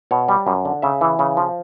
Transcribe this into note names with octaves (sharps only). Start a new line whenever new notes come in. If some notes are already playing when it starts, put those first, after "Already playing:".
B2 C#5
G3
F#2
D3
C#3 E5
E3
C#3
F3